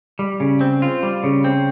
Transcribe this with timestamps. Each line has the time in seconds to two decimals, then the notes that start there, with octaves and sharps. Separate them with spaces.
0.19 G3
0.40 C#3
0.61 C4
0.82 F4
1.03 G3
1.24 C#3
1.44 C4